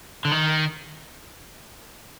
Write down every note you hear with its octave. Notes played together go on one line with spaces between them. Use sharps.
D3
D#3